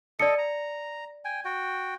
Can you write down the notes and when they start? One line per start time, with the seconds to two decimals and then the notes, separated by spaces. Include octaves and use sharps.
0.20 A4 D5 D#5 C#7
0.38 A#5
1.25 G5 G#5
1.45 F#4 G5